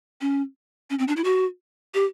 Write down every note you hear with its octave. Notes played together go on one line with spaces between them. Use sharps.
C#4
C#4
C4
D4
E4
F#4
G4